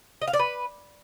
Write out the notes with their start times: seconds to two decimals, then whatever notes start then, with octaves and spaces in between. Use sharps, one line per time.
0.22 D#5
0.27 F5
0.33 D5
0.39 B4